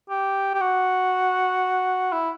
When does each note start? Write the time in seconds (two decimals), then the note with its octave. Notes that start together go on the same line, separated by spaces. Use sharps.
0.10 G4
0.55 G4
0.61 F#4
2.12 E4